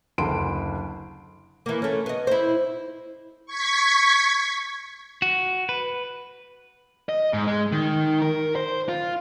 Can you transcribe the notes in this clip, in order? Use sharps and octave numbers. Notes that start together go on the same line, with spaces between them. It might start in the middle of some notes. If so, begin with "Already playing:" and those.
F#1 D2 C6 D7
E3 A#3
A3 C#4
B3 D#5
E4 C5
C#6 G#6 B6
F#4
B4
D#5
G#2
G#3
D#3
A#4
C5
F4